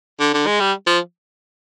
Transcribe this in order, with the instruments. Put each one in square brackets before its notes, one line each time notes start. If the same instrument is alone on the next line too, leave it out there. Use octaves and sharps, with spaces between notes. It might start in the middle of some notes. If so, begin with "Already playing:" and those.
[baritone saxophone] D3
D3
G#3
G3
F3